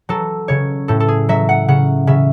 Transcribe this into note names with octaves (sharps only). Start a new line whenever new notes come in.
F#3 A4
C#3 C#5
A2 A4
A4
G#4
F#3 E5
F#5
C#3 F#5
C#3 E5